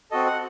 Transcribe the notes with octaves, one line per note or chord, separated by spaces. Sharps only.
C4 F#4 A4 D#5
F#5